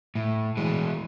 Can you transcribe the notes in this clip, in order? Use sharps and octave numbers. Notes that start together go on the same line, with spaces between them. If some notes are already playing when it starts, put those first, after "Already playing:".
A2
E3 G#3